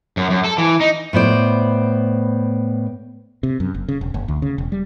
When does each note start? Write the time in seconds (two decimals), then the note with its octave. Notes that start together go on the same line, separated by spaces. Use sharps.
0.17 F#2
0.30 F#2
0.44 A4
0.58 E3
0.81 D#4
1.13 A2 B3 C5 D5
3.43 C3
3.60 F#2
3.74 F#1
3.88 C#3
4.01 E1
4.14 F#1
4.28 D2
4.42 C#3
4.58 E1
4.72 G3